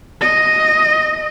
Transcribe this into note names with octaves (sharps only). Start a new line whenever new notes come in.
D#5